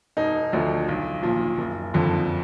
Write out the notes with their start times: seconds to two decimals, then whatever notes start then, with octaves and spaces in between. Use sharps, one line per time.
0.17 E1 D#4
0.52 D2 D3 F3
0.88 B1
1.23 A#2 F3
1.58 F#1
1.94 F2 D3